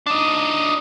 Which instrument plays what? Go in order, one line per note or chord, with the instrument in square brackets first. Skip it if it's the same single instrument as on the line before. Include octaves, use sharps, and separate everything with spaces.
[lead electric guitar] D4 D#4